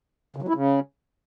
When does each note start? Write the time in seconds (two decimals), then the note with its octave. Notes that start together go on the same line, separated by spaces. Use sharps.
0.36 C#3
0.42 F#3
0.48 E4
0.54 C#3